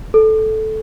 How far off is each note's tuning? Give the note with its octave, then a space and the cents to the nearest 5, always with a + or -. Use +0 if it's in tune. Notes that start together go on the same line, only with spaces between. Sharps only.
A4 -10